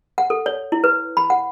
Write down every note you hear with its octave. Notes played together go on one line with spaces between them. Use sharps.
F#5
A4
C#5
E4
B4
B5
F#5